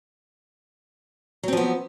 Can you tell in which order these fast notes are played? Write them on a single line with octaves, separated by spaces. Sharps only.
F#3 C4 F3 B3